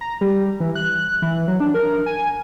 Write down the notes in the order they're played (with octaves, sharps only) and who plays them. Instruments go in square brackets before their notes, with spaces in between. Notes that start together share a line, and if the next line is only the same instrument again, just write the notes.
[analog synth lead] A#5
G3
E3
F#6
E3
F#3
D4
A#4
G#5